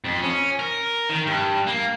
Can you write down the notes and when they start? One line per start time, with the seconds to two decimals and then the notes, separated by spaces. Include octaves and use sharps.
0.04 F2
0.21 C#4
0.59 A#4
1.09 D#3
1.26 G2
1.67 A#3